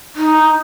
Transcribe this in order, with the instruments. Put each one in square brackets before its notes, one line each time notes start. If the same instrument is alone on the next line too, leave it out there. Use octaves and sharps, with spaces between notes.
[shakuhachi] D#4